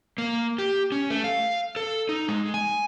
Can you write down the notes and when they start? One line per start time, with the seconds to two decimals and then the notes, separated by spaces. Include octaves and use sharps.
0.18 A#3
0.58 G4
0.92 C#4
1.10 A3
1.24 F5
1.76 A4
2.09 D#4
2.28 G#3
2.54 G#5